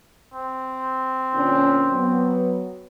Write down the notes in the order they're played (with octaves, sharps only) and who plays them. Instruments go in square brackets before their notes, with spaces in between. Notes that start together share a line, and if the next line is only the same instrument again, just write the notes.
[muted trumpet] C4
[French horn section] A#2 D3 C#4
F#3 B3